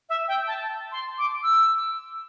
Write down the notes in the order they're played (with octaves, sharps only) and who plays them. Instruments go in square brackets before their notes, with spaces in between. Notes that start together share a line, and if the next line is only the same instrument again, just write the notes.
[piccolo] E5
G5
A5
C6
D6
E6